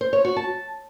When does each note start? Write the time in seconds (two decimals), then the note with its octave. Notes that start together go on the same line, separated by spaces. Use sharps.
0.01 C5
0.13 C#5
0.25 F#4
0.36 A5